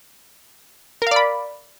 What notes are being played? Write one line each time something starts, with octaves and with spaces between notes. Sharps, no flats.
A#4 D5 F5 B5